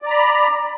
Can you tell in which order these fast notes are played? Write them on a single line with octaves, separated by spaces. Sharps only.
D5 A#5 B5